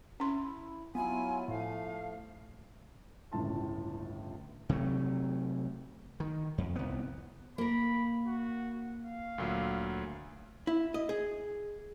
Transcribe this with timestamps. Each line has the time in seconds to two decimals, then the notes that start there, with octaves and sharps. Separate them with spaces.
0.20 C#4 E4 C6
0.95 F#3 B3 E4 F4 G#5
1.48 A2 F3 A3 F5
3.32 G1 C#2 A2 A5 C6
4.69 C3 F#3 A3
6.20 D#3
6.58 F2
6.76 C2 B3
7.58 A#3 A#4 B5
8.27 F#4
9.02 F5
9.38 D2 A#2 F#3
10.67 E4
10.94 D#5
11.09 G#4